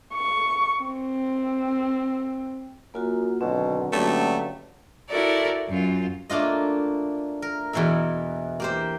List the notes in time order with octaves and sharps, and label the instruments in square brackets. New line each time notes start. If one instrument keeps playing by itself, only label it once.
[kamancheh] C#6
C4
[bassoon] F#2 [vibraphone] A#3 F4 F#4
[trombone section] B1 D3 D#3 [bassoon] B2 [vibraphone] C4
[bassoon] G2 [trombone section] D3 F#3 [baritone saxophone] A3 [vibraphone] A#3 C#4
[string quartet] E4 F#4 A4 A#4 D5
F#2 F4
[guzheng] A3 A#3 D4 F4 D#5
A#4
E2 B2 E3 A#4 E5
A#3 G4 C5